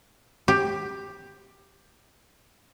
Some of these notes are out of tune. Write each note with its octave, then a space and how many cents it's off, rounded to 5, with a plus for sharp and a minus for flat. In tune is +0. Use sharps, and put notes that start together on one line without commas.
G4 +10